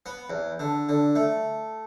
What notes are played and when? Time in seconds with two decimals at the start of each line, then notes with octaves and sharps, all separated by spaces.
0.06 B3
0.30 E2
0.59 D3
0.89 D3
1.16 A3